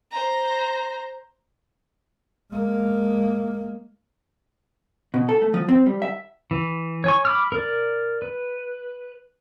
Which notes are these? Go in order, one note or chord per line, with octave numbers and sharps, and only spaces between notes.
C5 A#5
G#3 A#3
B2
A4
A3
F3
C4
G3
E5
E3
C#5 G#5 C#6
B5 D6 F6
A#4 D5
B4